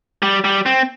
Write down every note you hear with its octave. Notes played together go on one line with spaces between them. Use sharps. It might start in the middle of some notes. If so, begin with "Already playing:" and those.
G3
G3
C4